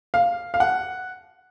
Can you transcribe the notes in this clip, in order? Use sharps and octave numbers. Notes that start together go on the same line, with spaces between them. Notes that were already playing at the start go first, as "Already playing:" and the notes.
F5
F5
F#5